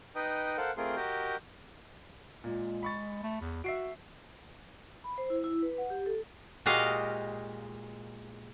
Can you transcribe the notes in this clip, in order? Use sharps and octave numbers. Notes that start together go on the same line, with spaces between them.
D#4 B4 D#5 G5 D#6
A4 A#4 C5 F5 F#5
A3 C4 F4 G#4 A#4 C6
F#4 G4 A#4 D#5 A#5 G6
A#2 G#3
B5 C#6 A6
A3
E2
F#4 E5 C7 D7
B5
C5
E4
E4
B4
F#5
G4
A4
A#2 G#3 F#4 G4 D#5 F5